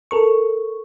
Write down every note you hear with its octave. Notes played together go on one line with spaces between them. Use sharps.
A4 A#4 C#6